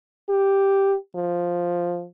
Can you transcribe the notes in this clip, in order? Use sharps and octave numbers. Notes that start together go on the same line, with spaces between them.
G4
F3